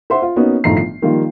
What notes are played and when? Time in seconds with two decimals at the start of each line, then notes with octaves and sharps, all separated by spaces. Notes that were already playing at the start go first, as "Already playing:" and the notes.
0.10 C5 E5 F#5 C6
0.22 F4
0.36 A#3 B3 C#4 D#4 F#4
0.64 G1 A2 D#3 F3 A#5 C7
0.77 C7
1.02 D#3 F3 G3 A#3 F4